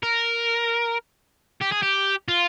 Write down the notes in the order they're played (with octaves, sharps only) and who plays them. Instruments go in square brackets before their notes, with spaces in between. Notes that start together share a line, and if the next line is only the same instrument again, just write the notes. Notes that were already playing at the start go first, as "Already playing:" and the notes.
[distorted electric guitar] A#4
G4
G#4
G4
F4